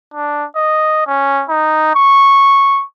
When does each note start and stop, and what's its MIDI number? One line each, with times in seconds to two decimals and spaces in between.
0.14 0.45 62
0.56 1.03 75
1.07 1.44 61
1.49 1.93 63
1.95 2.84 85